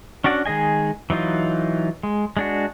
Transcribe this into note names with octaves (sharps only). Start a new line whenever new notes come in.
C#4 D4 F#4 D5 F#5
D#3 G#3 G#4 D#5 G#5
E3 F#3 D#4 F4
G#3
G#3 D4 F#4